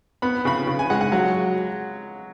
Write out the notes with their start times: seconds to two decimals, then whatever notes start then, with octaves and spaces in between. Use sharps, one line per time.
0.22 B3 B5
0.45 C#3 B5
0.67 C#3
0.79 G#5
0.90 G#3 F#5
1.01 F#5
1.12 F#3 F#5